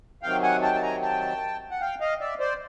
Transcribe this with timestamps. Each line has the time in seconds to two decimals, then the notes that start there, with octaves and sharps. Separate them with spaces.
0.23 C3 D#3 F#3 F5 G5
0.43 F#5 G#5
0.62 G5 A5
0.75 A5
0.82 G#5 A#5
1.02 G5 A5
1.71 F#5
1.81 F5 G5
2.00 D#5 F5
2.21 D5 E5
2.40 C5 D5